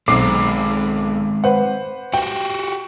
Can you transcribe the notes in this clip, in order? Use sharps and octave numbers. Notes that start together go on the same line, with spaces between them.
B1 G#3 C4 D6 C7
B4 C5 F#5
F#4 G4 G5